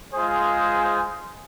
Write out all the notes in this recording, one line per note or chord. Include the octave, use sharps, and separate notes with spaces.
G#3 F4 G#4 C5